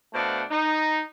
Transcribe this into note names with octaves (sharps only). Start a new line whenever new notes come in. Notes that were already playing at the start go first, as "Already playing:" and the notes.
B2 A3 D4 C5 F5 F#5
D#4